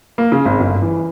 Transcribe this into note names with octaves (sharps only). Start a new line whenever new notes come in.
A#3
C#3
G#1
G1
E3